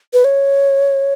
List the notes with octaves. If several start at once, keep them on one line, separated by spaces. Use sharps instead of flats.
B4
C#5